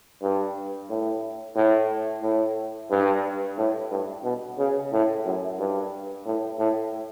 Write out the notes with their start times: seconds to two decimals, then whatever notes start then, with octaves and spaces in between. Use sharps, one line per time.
0.22 G2
0.89 A2
1.55 A2
2.22 A2
2.90 G2
3.57 A2
3.91 G2
4.24 B2
4.58 C#3
4.92 A2
5.25 F#2
5.59 G2
6.26 A2
6.58 A2